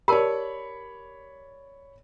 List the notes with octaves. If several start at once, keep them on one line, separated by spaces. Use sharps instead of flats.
G4 A#4 C#5 D5 A5 B5